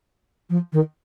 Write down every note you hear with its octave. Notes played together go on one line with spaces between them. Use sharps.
F3
D#3